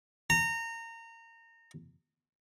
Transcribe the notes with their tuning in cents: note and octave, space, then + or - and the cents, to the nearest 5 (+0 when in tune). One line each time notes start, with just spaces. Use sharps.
A#5 -25